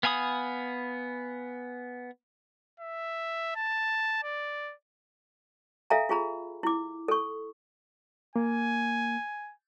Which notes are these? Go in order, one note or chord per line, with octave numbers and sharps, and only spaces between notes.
B3 F5 G#5 B5 D#6
E5
A5
D5
A4 E5 F5 G#5 A#5
F4 G#4 A#5 B5
E4 D6
A4 C#6
A#3 G#5